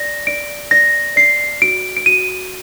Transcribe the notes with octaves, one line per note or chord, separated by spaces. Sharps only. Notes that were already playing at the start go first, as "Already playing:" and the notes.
Already playing: D5 A#6
D5 D7
D5 A#6
D5 C7
F#4 D7
D7
F#4 D#7